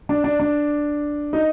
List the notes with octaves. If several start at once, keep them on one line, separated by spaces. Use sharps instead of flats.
D4
D4
D4
D#4